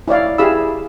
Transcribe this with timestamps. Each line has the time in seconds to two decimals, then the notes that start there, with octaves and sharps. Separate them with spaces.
0.08 E4 C#5 D5 F5
0.38 E4 G4 G#4 F5 B5 E6